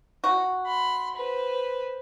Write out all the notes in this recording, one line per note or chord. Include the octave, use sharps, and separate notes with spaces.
F#4
B5 C6
B4 C5